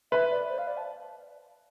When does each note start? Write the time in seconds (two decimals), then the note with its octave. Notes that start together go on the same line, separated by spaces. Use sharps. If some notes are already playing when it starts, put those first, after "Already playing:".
0.12 B4 E5
0.31 D5
0.49 C5
0.58 F5
0.67 D5
0.77 A5